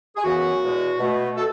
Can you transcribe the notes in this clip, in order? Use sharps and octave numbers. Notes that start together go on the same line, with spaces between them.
G#4
F#2 C#3 E3 B3 F#4
E2 B2 G#3
B2 A3
A3 F#4 A4